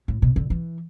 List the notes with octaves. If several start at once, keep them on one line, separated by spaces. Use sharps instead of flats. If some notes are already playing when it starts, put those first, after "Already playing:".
A2
B2
D3
E3